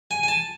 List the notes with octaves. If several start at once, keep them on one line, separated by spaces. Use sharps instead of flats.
G#5
G#5
A5